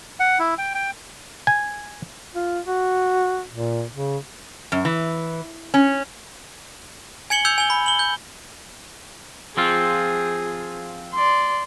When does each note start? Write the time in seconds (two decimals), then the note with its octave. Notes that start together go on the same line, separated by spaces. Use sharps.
0.20 F#5
0.40 E4
0.58 G5
0.75 G5
1.47 G#5
2.35 F4
2.66 F#4
3.51 A#2
3.94 C#3
4.72 F#2
4.85 E3
5.74 C#4
7.30 G#5 G#6 C#7 F#7 G7
7.45 E6 G6 G#6 C#7 F7
7.58 G#5 G7
7.70 B5
7.86 F#7 G7
7.99 G6
9.57 F3 C4 F4 G#4
11.15 D5 C6